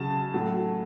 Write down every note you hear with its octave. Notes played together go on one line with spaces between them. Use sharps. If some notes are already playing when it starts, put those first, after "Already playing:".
Already playing: C#3 F#3 A5
A2 F#3